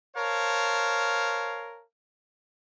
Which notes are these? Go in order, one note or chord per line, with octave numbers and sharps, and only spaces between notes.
A#4 C5 C#5 F5 A5